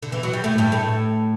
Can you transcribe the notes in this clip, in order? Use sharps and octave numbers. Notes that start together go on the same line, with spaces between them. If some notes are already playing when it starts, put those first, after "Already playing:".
D3
E3
F#3
G3
A2 A3
G2 G3
A2 A3